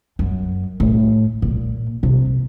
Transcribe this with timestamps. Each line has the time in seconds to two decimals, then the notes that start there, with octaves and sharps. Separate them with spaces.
0.19 F#2
0.80 A2
1.42 A#2
2.03 C3